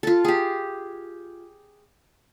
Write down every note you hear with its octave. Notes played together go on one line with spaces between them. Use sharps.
F4 A4
G4 G#4